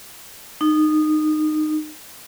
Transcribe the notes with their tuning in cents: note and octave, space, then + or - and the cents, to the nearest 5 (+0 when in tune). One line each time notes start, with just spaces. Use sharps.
D#4 -20